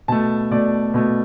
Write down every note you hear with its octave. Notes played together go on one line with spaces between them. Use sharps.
B2 A3 A5
B2 A3 D5
B2 A3